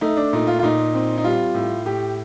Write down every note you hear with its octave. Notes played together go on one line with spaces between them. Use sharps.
A3 D#4
D4
A#2 D#4
F4
F4
A#2 D#4
C4
D#4
G3 F4
A2
A2 G4